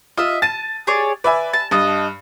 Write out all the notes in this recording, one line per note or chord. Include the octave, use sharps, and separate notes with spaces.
F4 D#5 E5
A5 A6 D#7
G#4 C#5 D5
B4 D5 E5 G#5
A5
G2 D#5 A5